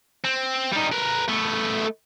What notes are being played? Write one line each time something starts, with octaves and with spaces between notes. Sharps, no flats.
C4
G3 D#4
A#4 B4
A3 B3